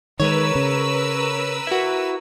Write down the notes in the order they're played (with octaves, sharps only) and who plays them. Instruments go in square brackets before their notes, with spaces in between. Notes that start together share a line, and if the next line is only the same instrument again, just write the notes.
[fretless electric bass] D#3 G#3 [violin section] A#4 B4 E6 [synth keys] C#5
[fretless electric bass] C#3
[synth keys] E4 F#4